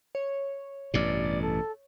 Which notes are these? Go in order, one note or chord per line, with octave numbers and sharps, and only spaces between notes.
C#5
A1 G2 B2 D5
A4